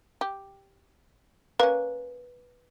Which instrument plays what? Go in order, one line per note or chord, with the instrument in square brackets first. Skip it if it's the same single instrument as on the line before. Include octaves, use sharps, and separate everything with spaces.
[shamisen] G4
[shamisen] A#3 C#4 [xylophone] B4